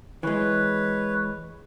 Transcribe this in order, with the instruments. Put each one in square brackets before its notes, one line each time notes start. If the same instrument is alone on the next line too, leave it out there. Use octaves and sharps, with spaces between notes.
[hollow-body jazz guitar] E3 G#3 [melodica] B4 C#5